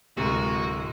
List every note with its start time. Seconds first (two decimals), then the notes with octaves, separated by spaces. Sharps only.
0.17 D1 C3 G#3 F#4 A#4 D#7